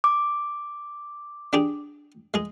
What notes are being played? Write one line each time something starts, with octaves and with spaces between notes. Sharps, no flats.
D6
D4 G4 G#4
G#3 G#4